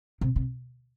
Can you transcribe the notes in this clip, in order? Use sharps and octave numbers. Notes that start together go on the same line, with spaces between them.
C3
C3